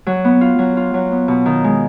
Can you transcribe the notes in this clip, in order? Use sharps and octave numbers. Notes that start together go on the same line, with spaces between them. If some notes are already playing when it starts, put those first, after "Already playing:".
F#3
B3
F4
F#3
F4
F#3
B3
B2
D#3
G#3